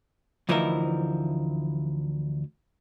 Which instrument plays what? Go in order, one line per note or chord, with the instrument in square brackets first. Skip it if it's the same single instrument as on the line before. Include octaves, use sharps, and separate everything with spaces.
[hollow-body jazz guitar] D2 E3 F3 D#4 E4 A#4